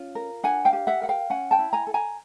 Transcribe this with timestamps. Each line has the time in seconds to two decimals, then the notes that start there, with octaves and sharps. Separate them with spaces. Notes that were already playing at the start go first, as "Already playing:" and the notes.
Already playing: C#4 F4
0.15 A#4
0.43 D4 F#5 G#5
0.65 F5 G5
0.73 G4
0.87 E5 F#5
1.01 A#4 F#5
1.09 F5 G5
1.30 C#4 F#5 G#5
1.51 G5 A5
1.59 E4
1.73 G#5 A#5
1.87 A4
1.94 G#5 A#5